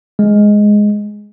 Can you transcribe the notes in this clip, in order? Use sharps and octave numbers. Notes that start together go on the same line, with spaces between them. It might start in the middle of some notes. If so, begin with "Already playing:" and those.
G#3